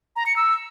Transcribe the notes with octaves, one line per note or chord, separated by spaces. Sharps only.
A#5
C#7
E6